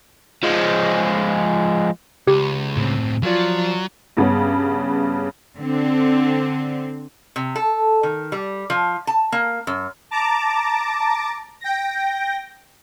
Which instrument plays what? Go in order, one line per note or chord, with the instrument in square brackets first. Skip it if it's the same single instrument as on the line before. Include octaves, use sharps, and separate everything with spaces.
[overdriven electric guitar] F3 G#3
[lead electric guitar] C#2 [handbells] G4
[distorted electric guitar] A2 C4
[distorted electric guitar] F3 [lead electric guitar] F#3 [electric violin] F4 D5
[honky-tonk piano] G2 C#3 B3 C#4
[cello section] D3 C4
[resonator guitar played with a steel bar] C3
A4
D#3
G3
F3
A5
A#3
F#2
[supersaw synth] A5 A#5 D6
G5 A#6